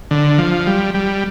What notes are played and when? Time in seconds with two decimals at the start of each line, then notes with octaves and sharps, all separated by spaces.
0.11 D3
0.38 F3
0.67 G3
0.94 G3